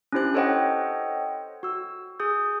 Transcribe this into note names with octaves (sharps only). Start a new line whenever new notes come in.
C#4 D4 E4 G4 C5 F#6
A4 C5 C#5 D#5 F#5 G5
F#4 E6
G#4 D#6 G6